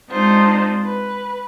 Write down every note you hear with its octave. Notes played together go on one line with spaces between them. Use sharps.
G#3 C4 D4 D#4 F4 C5
B4